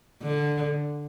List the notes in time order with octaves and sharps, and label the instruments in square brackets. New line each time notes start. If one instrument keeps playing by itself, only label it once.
[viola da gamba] D3